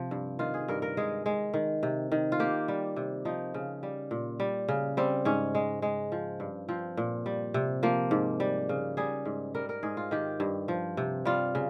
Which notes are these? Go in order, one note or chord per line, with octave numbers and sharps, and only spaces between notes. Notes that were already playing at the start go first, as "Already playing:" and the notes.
Already playing: C3 F3
G2
D#3 F4
G#4
G2 A#4
A#4
G#3 G#4
G#3
D#3
C3
D#3
F4
A#3 G4
G3
C3
F3 D#4
C#3
G3
A#2
G3
C#3
G3 C4
G#2 C#4
G#3
G#3
F3
G2
F3 C4
A#2
G3
C3
F3 A#3
G#2
G3
C#3
G3 G#4
G#2
G3 A#4
A#4
G#2 G#4
F4
D#3 G4
G2
F3
C3
G3 F4
C#3